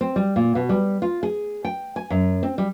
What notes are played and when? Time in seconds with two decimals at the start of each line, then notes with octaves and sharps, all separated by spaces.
0.01 C4
0.16 G3
0.36 A#2
0.55 B2
0.69 G3
1.02 F4
1.23 G#4
1.65 G5
1.96 G#5
2.10 F#2
2.43 C4
2.58 G3